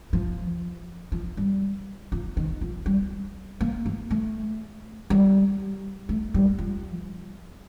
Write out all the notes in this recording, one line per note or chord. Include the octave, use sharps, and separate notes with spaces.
F3
F3
G3
F3
D#3
F3
G3
A#3
A#3
A3
G3
A3
G3
F3